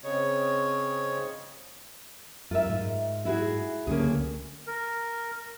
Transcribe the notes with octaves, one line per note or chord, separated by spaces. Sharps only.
C#3 C4 C#5 D#5
F#2 F4 A#4 E5
G#2
E4 F#4 G#4
C#2 D3 A#3 C#4 G#4
A#4